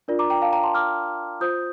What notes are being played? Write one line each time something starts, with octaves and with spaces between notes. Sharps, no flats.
D4 F4 A#4 D5
A#5 D6
G5 A#5
F5 A5
G5 A#5
A5 C6
D6 F6
F4 C5 D#6 G6